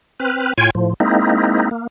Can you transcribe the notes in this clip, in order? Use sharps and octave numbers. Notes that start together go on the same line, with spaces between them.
C4 B4 F6
A2 F4 C#5 G5 G#5 G#6
A2 F3
G#3 A#3 C4 D#4 E4
A#3